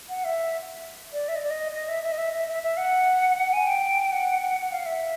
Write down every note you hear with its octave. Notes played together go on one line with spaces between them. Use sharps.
F#5
E5
D5
E5
D#5
D5
D#5
D#5
E5
E5
D#5
E5
E5
E5
E5
F#5
G#5
G5
F#5
F5
E5